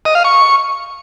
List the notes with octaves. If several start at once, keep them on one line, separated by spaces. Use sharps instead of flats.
D#5
F5
C#6